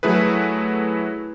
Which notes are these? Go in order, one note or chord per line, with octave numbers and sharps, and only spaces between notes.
F#3 A3 E4 G#4 B4